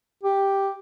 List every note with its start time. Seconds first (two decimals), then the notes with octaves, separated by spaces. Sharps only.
0.23 G4